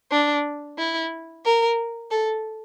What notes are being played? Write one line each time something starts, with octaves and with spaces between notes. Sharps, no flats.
D4
E4
A#4
A4